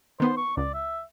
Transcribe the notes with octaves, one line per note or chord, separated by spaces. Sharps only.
D#3 B3 C5
C#6
C#2 D5
E5